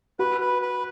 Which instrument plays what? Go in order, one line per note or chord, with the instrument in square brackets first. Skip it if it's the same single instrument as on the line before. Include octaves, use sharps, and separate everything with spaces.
[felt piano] F#4 [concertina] B4
[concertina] B4
B4